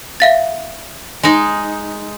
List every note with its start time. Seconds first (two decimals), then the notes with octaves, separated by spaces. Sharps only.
0.20 E5 F5 A6
1.23 G#3 D#4